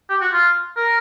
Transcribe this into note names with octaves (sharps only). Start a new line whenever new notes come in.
G4
F#4
F4
A#4